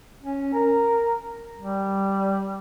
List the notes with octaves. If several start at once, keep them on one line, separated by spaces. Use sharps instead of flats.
C#4
A#4
G3